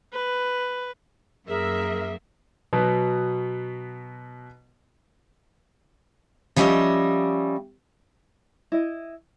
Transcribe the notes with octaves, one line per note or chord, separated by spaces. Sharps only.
B4
F#2 A#3 G#4 A#4 E5
B2 F#3 B3
F3 G3 C#4 G4 D#5 E5
E4 D#5